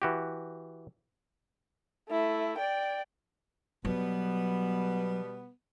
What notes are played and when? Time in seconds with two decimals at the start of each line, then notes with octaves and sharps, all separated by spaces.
0.02 E3 F#4 G4
2.09 A3 E4
2.58 D5 G5
3.85 B2 F#3 G3 B3